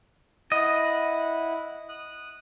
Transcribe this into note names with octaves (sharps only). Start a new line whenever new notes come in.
E4 D#5 F#5
D#6 F#6